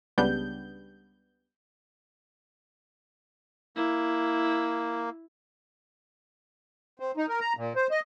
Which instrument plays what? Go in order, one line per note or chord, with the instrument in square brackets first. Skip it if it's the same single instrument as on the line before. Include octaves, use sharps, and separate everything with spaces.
[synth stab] C#2 C#3 G3 B3 D4 G6
[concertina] A#3 [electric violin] E4
[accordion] C4
D#4
A#4
A#5
A#2
C5
D#5